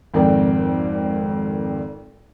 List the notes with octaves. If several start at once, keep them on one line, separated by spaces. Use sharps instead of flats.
G#1 F2 A#4 D5 G5